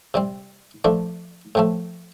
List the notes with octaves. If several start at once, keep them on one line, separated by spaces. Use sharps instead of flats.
C3 G3 C4
F3 A3 D4
A2 F3 A3